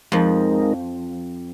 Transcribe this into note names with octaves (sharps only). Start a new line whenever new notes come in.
F2 F3 G#3 C4 D#4 A#4